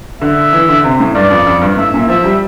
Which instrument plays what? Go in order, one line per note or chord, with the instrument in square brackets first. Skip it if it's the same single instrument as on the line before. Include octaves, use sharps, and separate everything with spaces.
[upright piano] D3 [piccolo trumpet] E5
[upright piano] E3
D3
C3
A2
[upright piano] G2 [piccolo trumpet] D5
[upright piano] F2
F2
G2
[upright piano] A2 [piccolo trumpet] E5
[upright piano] A#2
[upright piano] F3 [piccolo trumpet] E5
[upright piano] G3